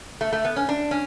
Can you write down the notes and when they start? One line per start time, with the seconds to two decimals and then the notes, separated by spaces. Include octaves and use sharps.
0.21 A3
0.33 A3
0.45 B3
0.56 C#4
0.69 D4
0.91 C#4